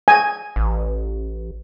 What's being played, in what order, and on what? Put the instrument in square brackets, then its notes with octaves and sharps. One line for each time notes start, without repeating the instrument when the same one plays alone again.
[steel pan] G#5
[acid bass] A1